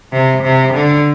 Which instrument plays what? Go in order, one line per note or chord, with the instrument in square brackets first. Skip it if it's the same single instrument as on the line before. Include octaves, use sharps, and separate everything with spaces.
[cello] C3
C3
D3